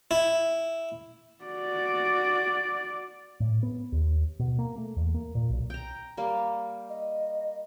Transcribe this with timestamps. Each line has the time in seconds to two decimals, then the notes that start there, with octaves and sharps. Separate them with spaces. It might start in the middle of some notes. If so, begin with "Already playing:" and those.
0.11 E4
1.44 F#4 D5
3.40 A2
3.63 B3
3.92 D#2
4.39 B2
4.59 A#3
4.78 A3
4.96 E2
5.14 A#3
5.35 A#2
5.50 B1
5.70 G5 A#5
6.17 G3 A#3
6.89 D#5